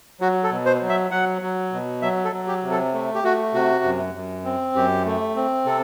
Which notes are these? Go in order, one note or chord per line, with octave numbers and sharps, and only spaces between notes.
F#3 F#4
A4
B2
C5
F#3
E5
F#3 F#5
F#3
B2
F#3 E5
A4
F#3
G4
C3
A4
A3
G4
A3 F#4
C3 F#4
F#2
F#2
C4
F#2 G4
A3
C4
C3 A4